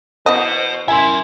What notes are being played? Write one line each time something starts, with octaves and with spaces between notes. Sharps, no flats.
B2 E3 B3 C5 D#5
E4 A#4 E5 G#5 C6